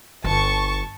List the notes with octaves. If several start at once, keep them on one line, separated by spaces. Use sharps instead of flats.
G1 A5 C#6